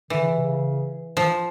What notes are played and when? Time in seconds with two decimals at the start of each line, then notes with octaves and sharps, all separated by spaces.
0.10 D3 E3
0.21 C#3
0.32 C3
0.42 C#3
1.17 F3